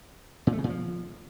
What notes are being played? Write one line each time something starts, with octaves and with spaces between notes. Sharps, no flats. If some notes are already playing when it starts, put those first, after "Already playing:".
A#2
A3
C#3
A#2
F3